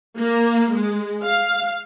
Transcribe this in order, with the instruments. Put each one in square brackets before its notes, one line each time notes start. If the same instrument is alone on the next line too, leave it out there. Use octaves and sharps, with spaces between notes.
[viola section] A#3
G#3
F5